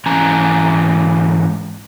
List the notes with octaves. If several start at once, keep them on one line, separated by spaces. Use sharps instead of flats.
G#2 E3 C#4 G#5 A#5